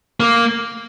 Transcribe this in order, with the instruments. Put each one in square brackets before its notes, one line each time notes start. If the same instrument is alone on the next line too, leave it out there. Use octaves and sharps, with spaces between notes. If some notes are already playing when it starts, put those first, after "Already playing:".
[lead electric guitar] A#3